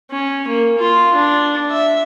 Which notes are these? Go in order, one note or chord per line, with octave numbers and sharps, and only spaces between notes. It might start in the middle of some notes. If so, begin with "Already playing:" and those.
C#4
A#3
F4
D4
E5